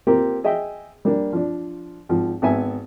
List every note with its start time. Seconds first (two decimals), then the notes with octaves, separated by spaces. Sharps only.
0.07 A#3 C4 F4 G4 A#4
0.44 G#4 D#5 E5 G5
1.05 G3 A#3 D4
1.33 F3 D4
2.09 G#1 F3
2.42 G#1 B3 E5 G#5